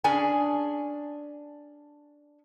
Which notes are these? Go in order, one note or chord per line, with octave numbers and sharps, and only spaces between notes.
C#4 D4 G#4 G#5